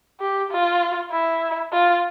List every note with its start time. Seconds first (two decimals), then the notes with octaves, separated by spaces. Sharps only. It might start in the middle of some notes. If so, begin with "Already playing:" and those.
0.20 G4
0.52 F4
1.12 E4
1.73 F4